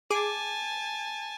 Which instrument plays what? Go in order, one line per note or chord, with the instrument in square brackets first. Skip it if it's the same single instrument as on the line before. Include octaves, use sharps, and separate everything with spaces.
[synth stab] G#4 D6 [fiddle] G#5 A5